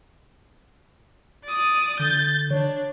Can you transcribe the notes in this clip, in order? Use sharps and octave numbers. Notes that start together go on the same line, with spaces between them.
D5 D#6
D3 G6 A6
D4 C#5